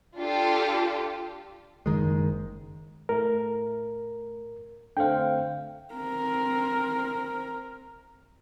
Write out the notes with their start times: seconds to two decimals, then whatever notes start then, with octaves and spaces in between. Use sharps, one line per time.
0.19 D4 F4 G4 A4
1.86 F#1 D#3 G#3
3.09 A2 A3 A#4
4.97 D3 A3 C4 F5 G5
5.94 C4 A#4